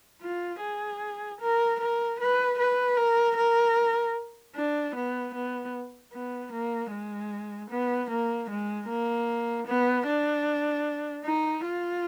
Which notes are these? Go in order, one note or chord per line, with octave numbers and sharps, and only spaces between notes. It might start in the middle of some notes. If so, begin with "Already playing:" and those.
F4
G#4
A#4
A#4
B4
B4
A#4
A#4
D4
B3
B3
B3
A#3
G#3
B3
A#3
G#3
A#3
B3
D4
D#4
F4